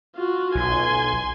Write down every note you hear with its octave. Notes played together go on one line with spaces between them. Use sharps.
F4 F#4
B1 G#5 C6